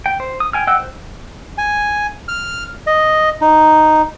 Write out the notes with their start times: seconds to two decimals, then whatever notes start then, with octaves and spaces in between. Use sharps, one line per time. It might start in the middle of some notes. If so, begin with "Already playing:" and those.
0.06 G5
0.20 C5
0.40 D#6
0.53 G5 G#5 F6
0.67 D#5 F#5 G5 E6 F#6
0.79 C5
1.58 G#5
2.28 F6
2.87 D#5
3.41 D#4